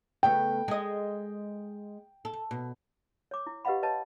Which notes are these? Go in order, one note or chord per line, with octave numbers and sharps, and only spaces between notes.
C#3 A3 B3 G5
G#3 D#5
A4
B2
C#5 D6
E4
G4 B4 D#5 F5 F#5 B5
B4 C#5 D#5 A5